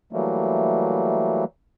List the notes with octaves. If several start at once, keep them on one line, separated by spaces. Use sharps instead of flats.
E3 F#3 G3 A3 A#3